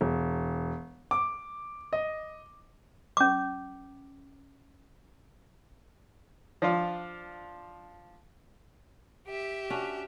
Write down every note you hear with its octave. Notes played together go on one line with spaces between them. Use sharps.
E1
D6
D#5
C#4 D6
F3 D4 F4
G4 E5
C#4 D4 F#4